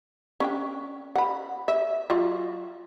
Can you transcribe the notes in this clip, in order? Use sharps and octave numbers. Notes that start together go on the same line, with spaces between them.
C#4 D4 G5
F#5 B5
E5
F#3 F4 D#5